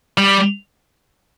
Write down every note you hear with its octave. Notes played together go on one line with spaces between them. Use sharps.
G3